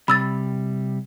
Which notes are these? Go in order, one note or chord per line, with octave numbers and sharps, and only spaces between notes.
C3 G3 B5 E6 A6